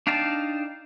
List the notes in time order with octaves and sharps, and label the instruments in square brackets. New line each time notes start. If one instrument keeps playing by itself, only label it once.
[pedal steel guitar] D4 D#4 F5 G5 A5